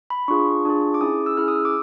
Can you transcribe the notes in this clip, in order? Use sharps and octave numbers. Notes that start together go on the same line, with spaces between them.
B5
D4 F4 G#4 C#6
D4 F4 G#4
D6
C#4 E4 G#4 D#6
E6
C#4 E4 G#4 F6
D#6
E6
D6